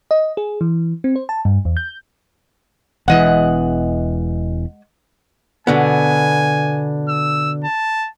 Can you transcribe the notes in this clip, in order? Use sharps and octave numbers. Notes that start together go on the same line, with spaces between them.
D#5
G#4
E3
C4
C5
A5
G2
E2
G6
E1 E2 E3 G#3 D#5 F#5
B2 D3 B3 G#5
E6
A5